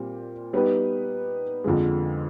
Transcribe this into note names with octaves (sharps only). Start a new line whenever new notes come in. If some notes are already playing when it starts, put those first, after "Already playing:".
Already playing: A#2 G3 C4
G3 B3 D#4 G4 B4
F2 D3 F3 G#3